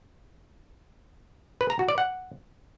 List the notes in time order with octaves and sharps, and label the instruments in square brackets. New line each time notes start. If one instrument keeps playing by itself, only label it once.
[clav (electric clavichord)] B4
A#5
F#4
D5
F#5